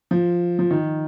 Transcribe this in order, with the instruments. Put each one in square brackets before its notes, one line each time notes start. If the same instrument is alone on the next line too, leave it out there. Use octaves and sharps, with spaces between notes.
[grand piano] F3
F3
D#3